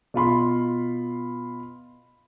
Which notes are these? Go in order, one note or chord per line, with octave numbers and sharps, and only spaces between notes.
B2 F4 B5 C6